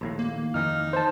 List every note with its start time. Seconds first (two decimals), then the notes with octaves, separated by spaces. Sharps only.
0.01 A#1 D#2 A2
0.19 A#3
0.38 D#3
0.54 F2 D#3 E3 D#4 F6
0.93 C5 A5